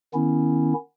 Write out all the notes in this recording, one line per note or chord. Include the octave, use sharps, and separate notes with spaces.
D#3 B3 C#4 E4